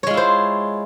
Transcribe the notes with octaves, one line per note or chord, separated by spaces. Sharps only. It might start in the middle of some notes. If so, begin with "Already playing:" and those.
G#3 E4 F4 C5 C#5